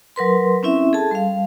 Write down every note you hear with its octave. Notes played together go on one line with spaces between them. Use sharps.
F#3 A#4 B4 C6
C4 C#4 E4 E5
G#4 A4 A5
G3 F5